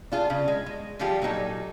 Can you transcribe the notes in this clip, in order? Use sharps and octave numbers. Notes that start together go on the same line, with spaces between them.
D4 F4 G#4
C#3
G#3
G#3
D3 F3 G3 F4 G4 G#4
A#2 F#3 D#4 A4